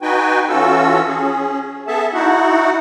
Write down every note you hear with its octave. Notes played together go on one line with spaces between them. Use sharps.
D#4 F#4 B4 G5 G#5
E3 C#4 F4 F#4 A4 E6
C#4 G#4
B3 G#4 A4 E5 A5
D#4 E4 F#4 F#5